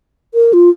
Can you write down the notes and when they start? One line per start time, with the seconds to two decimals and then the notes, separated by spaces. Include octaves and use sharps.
0.34 A#4
0.53 F4